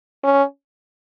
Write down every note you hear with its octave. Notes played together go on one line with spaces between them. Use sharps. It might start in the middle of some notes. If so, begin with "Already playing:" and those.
C#4